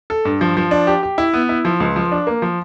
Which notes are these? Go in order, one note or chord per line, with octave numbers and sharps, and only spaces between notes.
A4
G2
F3
F3
D4
G4
G4
E4
B3
E4
F3
C#2
F3
D4
A#3
F3